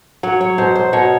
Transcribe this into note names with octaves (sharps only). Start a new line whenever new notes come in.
F#3 C#5
C#5
B2 C5
C5
B2 C#5